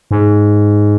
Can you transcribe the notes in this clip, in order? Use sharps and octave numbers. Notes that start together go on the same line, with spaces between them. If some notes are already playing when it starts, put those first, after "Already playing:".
G#2